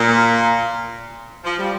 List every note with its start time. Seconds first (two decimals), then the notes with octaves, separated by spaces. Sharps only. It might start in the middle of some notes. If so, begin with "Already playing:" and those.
Already playing: A#2
1.44 F3
1.57 G3